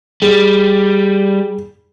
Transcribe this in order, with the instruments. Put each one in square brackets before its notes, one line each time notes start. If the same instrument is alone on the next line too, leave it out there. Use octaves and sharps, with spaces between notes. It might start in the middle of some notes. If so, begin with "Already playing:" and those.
[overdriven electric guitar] G3 [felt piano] G#4